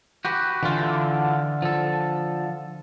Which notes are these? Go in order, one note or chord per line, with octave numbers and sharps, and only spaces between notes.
F#4 G4 B4
D3 E3 F4
F3 A4